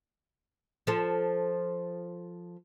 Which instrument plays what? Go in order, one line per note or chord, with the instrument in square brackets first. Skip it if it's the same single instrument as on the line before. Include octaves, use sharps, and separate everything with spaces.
[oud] F3 A4